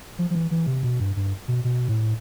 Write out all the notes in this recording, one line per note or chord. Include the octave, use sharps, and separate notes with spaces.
F3
F3
E3
E3
C3
B2
G2
G2
B2
B2
A2